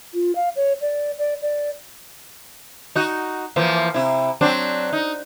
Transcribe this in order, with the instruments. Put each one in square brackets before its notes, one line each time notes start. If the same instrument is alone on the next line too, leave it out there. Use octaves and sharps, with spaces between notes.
[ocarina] F4
F5
C#5
D5
D5
D5
[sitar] D#4 F#4
E3 F3 A#3
C3 E4
F#3 C4 D4
D#4